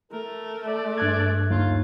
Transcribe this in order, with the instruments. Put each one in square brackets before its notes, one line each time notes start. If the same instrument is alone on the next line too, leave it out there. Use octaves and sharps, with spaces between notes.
[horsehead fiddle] A3 [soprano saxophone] A#4
[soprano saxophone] D5
[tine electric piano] G2 F#6 G#6
[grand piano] D#2 [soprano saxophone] F4